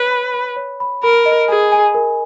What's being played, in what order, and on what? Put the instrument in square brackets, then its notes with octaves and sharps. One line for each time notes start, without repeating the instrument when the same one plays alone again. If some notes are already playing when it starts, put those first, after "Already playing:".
Already playing: [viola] B4 [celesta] C#5 B5
[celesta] B5
B5
C#5
B5
[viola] A#4 [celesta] B5
[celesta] D#5
[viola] G#4 [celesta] G#5
[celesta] G#5
A#4